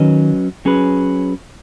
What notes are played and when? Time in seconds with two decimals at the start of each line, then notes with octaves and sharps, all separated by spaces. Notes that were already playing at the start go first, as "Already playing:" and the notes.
Already playing: D#3 F#3 C#4 B4 D#5
0.65 F#3 C#4 G#4 B4